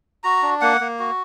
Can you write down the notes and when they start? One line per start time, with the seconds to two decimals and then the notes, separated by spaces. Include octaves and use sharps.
0.24 F#4 A#5
0.43 D4
0.61 A#3 F#5
0.81 A#3
0.99 F#4